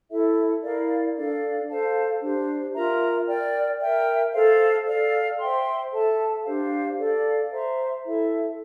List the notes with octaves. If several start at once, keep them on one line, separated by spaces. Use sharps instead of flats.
E4 A4 E5
E4 A#4 D5 F5
D4 A4 D5 F5
A4 C5 F5 A5
D4 G4 C5
F4 A#4 E5 A#5
A#4 D5 G5
A#4 E5 G5
A4 C5 F5
A4 D5 F5
C5 E5 G5 C6
A4 E5 A5
D4 G4 C5 F5
A4 D5 F5
C5 E5 A#5
E4 A4 E5